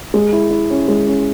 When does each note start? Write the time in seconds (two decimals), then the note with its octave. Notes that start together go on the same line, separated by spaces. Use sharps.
0.14 G#3
0.33 E4
0.51 E4
0.70 C#4
0.88 G#3
1.07 C#4